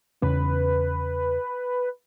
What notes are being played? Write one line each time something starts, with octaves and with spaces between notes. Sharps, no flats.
E2 C#3 C#4 B4